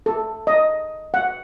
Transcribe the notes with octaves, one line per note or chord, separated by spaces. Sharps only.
A4
D#5
F#5